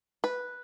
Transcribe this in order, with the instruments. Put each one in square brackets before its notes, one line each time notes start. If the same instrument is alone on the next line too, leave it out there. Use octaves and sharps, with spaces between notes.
[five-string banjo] B4